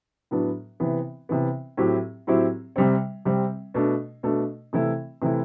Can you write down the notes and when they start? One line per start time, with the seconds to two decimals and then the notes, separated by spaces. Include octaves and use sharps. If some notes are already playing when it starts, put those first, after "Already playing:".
0.31 A2 F#3 B3 D4
0.80 C3 E3 B3
1.29 C3 E3 B3
1.77 A2 F#3 C4 E4 G4
2.27 A2 F#3 C4 E4 G4
2.76 C3 G3 C4
3.25 C3 G3 C4
3.74 B2 A3 D4
4.23 B2 A3 D4
4.73 C3 E3 A3 E4
5.22 C3 E3 A3 E4